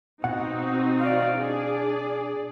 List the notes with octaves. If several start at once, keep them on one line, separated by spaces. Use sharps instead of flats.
B2 C4 D#4 F#4 F#5
D5 F5
D4 G#4 D5